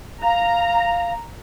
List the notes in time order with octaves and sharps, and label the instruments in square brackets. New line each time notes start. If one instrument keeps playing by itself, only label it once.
[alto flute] F5 [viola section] A#5